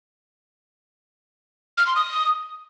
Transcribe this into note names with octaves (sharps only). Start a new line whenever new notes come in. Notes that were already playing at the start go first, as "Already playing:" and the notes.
F6
C6
D#6